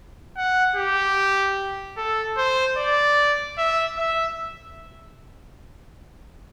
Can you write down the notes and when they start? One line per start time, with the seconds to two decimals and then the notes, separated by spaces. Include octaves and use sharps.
0.37 F#5
0.76 G4
1.97 A4
2.37 C5
2.77 D5
3.58 E5
3.98 E5